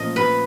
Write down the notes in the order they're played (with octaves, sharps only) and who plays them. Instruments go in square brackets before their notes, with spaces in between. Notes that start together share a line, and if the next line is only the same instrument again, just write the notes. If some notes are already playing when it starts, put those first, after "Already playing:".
Already playing: [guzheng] A#2 F3 A3 C#4 D#5
B4